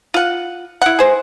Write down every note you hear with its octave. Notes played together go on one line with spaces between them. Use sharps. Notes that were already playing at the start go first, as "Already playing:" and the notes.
F4 F#5
E4 F#5
G#4 C5